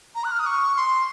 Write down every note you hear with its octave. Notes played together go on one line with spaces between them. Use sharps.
A#5
F#6
F6
D#6
C#6
C6